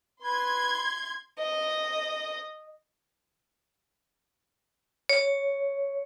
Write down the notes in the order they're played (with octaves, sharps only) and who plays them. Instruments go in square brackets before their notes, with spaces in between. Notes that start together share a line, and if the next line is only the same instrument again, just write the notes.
[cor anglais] B4 [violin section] C6 G#6
[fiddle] D#5
[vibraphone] C#5